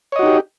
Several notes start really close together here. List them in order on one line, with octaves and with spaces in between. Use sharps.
C#5 D#5 F#4 D#4 G4